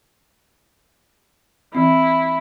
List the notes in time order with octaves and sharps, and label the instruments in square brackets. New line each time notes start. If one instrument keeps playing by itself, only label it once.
[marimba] E3 C4 [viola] E4